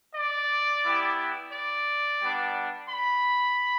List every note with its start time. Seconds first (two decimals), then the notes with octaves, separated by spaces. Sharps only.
0.15 D5
0.84 B3 E4 G4
1.52 D5
2.21 G3 B3 D4
2.90 B5